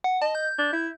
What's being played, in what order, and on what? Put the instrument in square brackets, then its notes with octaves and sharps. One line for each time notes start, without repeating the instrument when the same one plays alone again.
[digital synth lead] F#5
[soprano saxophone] D#5 [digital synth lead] A5
[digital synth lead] G6
[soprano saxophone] D4
E4